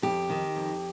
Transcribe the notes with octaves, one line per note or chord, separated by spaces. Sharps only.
F2 G4
D#3
F2